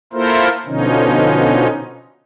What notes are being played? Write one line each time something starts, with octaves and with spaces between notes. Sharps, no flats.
A#3 E4 F4 A4 A#4 C5
B2 D3 F3 C#4 D#4